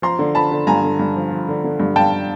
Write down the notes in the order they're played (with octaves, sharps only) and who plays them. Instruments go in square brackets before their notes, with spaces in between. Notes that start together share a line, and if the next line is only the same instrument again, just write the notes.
[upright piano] F3 A#5 C6
D3
F3 A5 B5
D3
G2 G#5 A#5
D3
G2
F3
F3
D3
D3
G2
G2 G5 A5